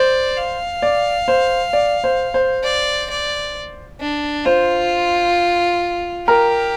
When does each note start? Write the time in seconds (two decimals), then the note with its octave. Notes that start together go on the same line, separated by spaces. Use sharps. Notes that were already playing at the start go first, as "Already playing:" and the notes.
Already playing: C5 D5
0.37 F5
0.82 D5
1.28 C5
1.73 D5
2.04 C5
2.34 C5
2.64 D5
3.10 D5
4.00 D4
4.46 F4 C5
6.28 G4 A#4